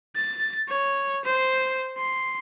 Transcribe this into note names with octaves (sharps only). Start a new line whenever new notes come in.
A6
C#5
C5
C6